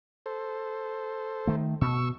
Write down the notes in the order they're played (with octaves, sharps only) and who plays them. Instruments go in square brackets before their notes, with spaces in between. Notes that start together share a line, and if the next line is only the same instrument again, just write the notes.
[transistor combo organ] A4 C5
[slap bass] D#3 A3
[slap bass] B2 [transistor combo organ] C#6 E6